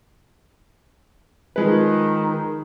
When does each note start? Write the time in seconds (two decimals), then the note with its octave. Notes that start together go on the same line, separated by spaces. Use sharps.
1.56 D#3 F3 G#3 B4